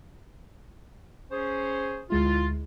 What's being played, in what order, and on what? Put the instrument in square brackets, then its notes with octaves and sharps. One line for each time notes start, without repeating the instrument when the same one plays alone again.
[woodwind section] C#4 G#4 C5
[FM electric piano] D2 G#3 E4 [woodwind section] F4